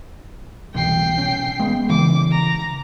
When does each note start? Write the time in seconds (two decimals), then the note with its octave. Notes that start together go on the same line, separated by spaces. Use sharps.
0.74 C2 B2 E3 G5 C7
1.18 C#4
1.59 G#3 B3
1.90 C#3 E3 D6
2.32 A#5